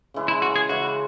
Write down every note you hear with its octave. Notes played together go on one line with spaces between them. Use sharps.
C#3 E3 G#3
E4
F#4
G#4
C#3 E3 G#3 F#4